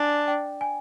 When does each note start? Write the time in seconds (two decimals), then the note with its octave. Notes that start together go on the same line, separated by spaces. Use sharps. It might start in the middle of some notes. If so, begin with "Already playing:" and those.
Already playing: D4 G#5
0.28 G5
0.61 G#5